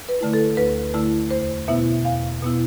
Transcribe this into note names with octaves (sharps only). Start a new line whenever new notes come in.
B4
D3 A3 E4
A4
D2 B4
D3 A3 E4
E2 C5
B2 B3 E4 E5
E2 F5
B2 B3 E4